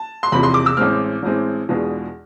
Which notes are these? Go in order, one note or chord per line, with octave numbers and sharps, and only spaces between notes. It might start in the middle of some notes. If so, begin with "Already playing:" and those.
Already playing: A5
C6
E1 E2 C3 F3 B5
C6
D6
E6
A1 A2 G#3 C4 F6
A1 A2 G#3 C4
E2 B2 G#3 D4 F4